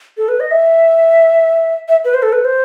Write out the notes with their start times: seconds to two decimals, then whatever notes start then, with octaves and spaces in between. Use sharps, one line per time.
0.17 A4
0.28 B4
0.40 D#5
0.51 E5
1.88 E5
2.05 B4
2.14 C5
2.22 A4
2.33 B4
2.45 C5